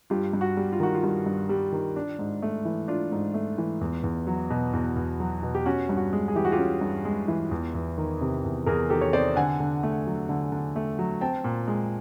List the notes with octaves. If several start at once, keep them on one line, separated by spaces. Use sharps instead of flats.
G2 F4 G4
G2
F#4
G3
F4
D#3 F#4
F4
G2
G2
G3
D#3
D4
G#2
A3
E3
D4 F4
G#2
A3
E3
E2
E2
F#3
B2
E2
E2
F#3
B2
G4
C#4 F#4
G2
F#4
G#3
G#4
E3 G4
F#4
F4 G4
C#4
G2
G#3
E3
E2
E2
D#3
C3
E2
E2 G#4 A#4
D#3 G4 A4
C#5
C3 C5 D5
D3 F#5 G#5
D3
A3
F#3
D3
D3
A3
F#3
C4 G5 A5
A#2
G#3